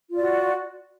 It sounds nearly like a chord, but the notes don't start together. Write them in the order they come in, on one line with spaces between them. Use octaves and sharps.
F4 D5 F#4